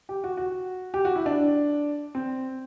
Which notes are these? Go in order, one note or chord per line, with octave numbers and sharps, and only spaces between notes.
G4
F#4
F#4
G4
F#4
E4
D4
C4